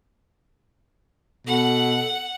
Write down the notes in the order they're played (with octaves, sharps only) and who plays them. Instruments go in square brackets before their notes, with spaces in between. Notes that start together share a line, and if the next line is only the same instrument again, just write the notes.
[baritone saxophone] B2 [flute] A4 [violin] F#5